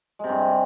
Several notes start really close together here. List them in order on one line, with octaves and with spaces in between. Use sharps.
G#3 C3 G2